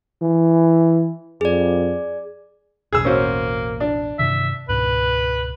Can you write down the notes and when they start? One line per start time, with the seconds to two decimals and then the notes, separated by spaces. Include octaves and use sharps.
0.22 E3
1.41 F2 G#4 D5
2.93 A1 E2 B2 G#4 E6
3.05 A#3 C#4 F#4 C5
3.80 D4
4.19 G2 C3 D#3 E5
4.69 C#2 G#2 B2 B4